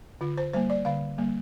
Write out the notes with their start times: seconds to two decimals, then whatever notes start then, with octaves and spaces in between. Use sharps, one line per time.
0.21 D3 F4
0.38 C5
0.53 G3 A#3 C5
0.70 D5
0.85 D3 F5
1.18 G3 A#3